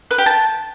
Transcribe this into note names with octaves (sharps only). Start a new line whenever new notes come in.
B4
G4
A5